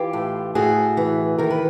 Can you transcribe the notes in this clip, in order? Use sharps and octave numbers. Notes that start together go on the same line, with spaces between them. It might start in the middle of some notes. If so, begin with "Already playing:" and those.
Already playing: E3 F4 G4
A2
A2 F#4 G#4
E3
D#3 A#4
B4